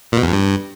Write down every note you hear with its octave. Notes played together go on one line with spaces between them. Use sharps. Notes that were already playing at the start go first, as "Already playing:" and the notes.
A#2
B2
E2
F2
G2